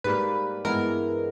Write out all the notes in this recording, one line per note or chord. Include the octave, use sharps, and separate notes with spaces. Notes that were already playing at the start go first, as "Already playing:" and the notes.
G#2 G3 A#3 B4
G2 E3 G#3 B3 A#4